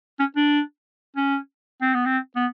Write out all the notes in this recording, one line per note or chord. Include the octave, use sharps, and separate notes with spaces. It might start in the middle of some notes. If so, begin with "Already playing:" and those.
C#4
D4
C#4
C4
B3
C4
B3